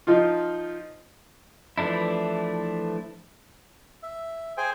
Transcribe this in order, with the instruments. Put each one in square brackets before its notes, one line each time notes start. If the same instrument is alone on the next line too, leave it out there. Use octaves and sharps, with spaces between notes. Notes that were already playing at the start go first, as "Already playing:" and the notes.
[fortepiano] F3 D#4 F4
[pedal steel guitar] E3 F3 A3 D4 E4
[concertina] E5
G#4 C5 G5 G#5